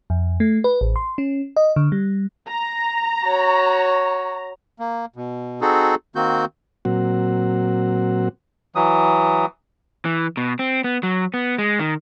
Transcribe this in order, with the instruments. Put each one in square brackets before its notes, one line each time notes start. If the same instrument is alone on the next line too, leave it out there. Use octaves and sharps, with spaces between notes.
[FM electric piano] F2
A3
B4
A1
C6
C#4
D#5
D3
G3
[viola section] A#5
[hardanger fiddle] F#4 C#5
[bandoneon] A#3
B2
C4 D#4 F#4 G#4 A4
D#3 A#3 C4 F#4 G6
[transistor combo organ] A#2 F#3 C4 F#4
[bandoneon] E3 F#3 D#6
[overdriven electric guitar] E3
B2
C4
B3
F#3
B3
G#3
D#3